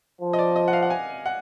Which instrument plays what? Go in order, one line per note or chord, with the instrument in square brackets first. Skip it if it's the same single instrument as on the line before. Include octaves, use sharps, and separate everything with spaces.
[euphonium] F3
[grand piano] D#5
D5
D#5
F#5
F5
F#5
G#5
F#5